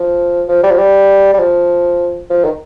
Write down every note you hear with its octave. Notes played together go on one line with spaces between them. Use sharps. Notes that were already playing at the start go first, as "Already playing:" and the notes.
Already playing: F3
F3
G3
F3
G3
G3
F3
F3
D#3